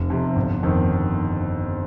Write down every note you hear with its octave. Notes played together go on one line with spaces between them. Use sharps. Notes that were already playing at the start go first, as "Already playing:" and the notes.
Already playing: F1
F2 C3
G1
F2 D#3